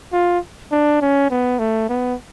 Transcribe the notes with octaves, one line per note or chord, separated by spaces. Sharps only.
F4
D4
C#4
B3
A3
B3